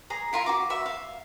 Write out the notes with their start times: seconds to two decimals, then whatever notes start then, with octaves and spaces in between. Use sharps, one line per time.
0.10 G#4 A#5 D#6
0.33 E4 F4 A#4 A#5
0.46 F#4 A#5 D6
0.70 F#4 E5 B5
0.86 F5